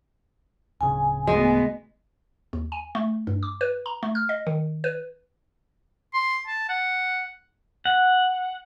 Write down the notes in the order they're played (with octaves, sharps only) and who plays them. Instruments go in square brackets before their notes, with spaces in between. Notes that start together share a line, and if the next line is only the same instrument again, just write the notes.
[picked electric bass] D1 C#3 [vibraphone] G#5
[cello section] D2 B3 [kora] G#3
[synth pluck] D#2
G#5
A3
G2
D6
B4
A#5
A3
F6
D#5
D#3
B4
[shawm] C6
A5
F#5
[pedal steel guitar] F#5